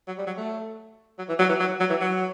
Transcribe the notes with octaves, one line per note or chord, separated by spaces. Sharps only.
F#3
G3
F#3
A3
F#3
E3
F#3
E3
F#3
F#3
E3
F#3